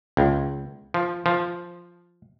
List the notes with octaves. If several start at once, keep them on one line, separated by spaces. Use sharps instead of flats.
C#2
F3
F3